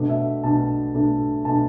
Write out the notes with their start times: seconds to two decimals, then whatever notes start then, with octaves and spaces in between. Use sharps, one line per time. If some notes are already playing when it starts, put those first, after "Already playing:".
Already playing: B2 A3 D4
0.09 E5
0.44 B2 A3 D4 A5
0.94 B2 A3 D4
1.45 B2 A3 D4 A5